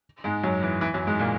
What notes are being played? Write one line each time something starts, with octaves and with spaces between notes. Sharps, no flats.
G#2 G#3
F#2 F#3
E3
E3
F#2 F#3
G#2 G#3
A#2 A#3